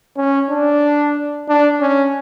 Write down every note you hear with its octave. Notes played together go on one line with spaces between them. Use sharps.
C#4
D4
D4
C#4